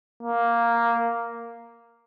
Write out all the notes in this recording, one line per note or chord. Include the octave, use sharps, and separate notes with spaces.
A#3